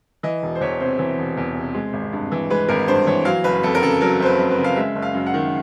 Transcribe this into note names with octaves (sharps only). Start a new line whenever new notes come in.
E3 D#5
E1
C5
E2 C#5
C3 C5
E3
E1
E2
C3
G#3
G#1
G2
E3
G#3 B4
G#1 A#4
G2 C5
E3 C#5
F#3 F5
F#1 B4
F2 A4
A#4
C#3 A4
F#3 A#4
F#1 C5
B4
F2
B4
C#3
F5
G#3 E5
F#1
F5
F#2
F#5
D#3